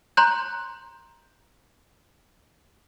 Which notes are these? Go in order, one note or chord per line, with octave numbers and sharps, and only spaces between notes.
A#5 C6 F#6 G6